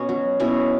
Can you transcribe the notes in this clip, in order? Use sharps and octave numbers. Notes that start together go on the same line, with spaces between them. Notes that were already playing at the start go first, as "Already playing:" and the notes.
Already playing: B2 C#4
F#3
B2 C#4 E4